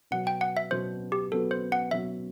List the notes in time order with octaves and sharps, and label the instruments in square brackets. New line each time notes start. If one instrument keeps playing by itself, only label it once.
[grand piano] B2 F#3 B3 F#4 [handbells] F#5
[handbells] G5
F#5
E5
[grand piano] B2 F#3 B3 F#4 [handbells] C5
[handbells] G4
[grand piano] B2 F#3 B3 F#4 [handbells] A4
[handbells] C5
F#5
[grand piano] B2 F#3 B3 F#4 [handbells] E5